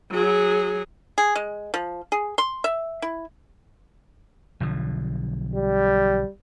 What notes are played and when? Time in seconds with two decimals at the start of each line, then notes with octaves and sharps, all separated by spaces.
0.11 F#3 G#4
1.18 G#4
1.36 G#3
1.74 F3
2.12 G#4
2.38 C6
2.64 E5
3.02 E4
4.60 B1 D3 F3
5.55 G3